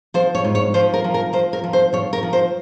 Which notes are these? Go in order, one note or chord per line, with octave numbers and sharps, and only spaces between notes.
F3 C5
C#5
G#2
C#5
F3 C5
A#4
F3
A#4
F3 C5
A#4
F3
C5
F3 C#5
A#4
F3
C5